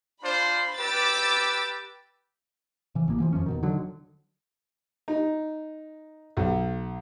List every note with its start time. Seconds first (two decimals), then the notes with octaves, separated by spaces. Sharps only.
0.23 D4 F4 C5 B5
0.77 G4 B4 D6 E6 A6
2.95 C3 E3
3.08 A1 A#3
3.20 E3 F3
3.33 F2 E3 F3 C#4
3.46 E2 B2 D#3
3.63 D3 D#3 F#3
5.08 D#4
6.37 B1